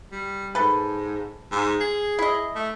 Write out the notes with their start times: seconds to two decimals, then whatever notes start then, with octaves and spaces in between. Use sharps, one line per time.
0.12 G3
0.55 G#2 A4 B4
1.52 G#2
1.81 G#4
2.19 E4 D#5
2.55 A3